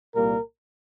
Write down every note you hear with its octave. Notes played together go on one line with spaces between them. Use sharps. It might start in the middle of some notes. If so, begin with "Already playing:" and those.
C2 A#2 G3 A#3 A#4